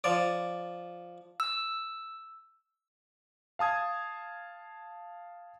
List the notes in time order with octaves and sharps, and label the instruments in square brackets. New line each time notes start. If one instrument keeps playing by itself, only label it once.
[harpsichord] F3 D5
[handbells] E6
[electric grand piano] F5 A5 D#6 G#6